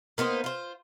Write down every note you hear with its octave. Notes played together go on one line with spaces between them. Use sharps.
A#3 B3 D#4 C5
F4 C5